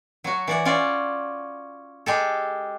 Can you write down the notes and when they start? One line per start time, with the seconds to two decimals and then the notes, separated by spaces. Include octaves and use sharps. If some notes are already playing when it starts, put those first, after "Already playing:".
0.24 F#3 F#4
0.47 E3 D5 F#5
0.65 C#4 F4 F#4 D5
2.06 G#3 G4 A4